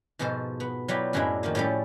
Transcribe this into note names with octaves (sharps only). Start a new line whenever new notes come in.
G#2 B2 F3 A4 C5
B3
F#3 G3 E4 F4 G4
F#2 A2 F#3 G#3 D4 E4
D#3 F3 A3 A#3
A2 F3 G3 C#4 A4